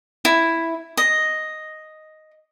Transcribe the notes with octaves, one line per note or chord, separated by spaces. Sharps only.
E4
D#5